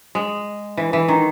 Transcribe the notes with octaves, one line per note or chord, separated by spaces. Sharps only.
G#3
E3
E3
D#3